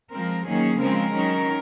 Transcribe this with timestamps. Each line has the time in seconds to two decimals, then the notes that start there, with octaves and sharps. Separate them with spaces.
0.12 F3 G#3 C4 A#4
0.46 D#3 F#3 A#3 C#4 G#4
0.80 C#3 F3 G#3 C4 A#4
1.14 D#3 F#3 C#4